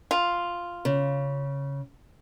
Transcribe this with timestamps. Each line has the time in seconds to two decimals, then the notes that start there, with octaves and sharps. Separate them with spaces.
0.11 F4
0.85 C#3